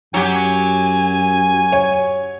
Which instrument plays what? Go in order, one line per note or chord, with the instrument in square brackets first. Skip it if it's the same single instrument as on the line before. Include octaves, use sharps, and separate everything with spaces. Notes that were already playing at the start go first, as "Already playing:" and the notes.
[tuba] F#2 [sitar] F#3 G4 [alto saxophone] G#5
[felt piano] C#5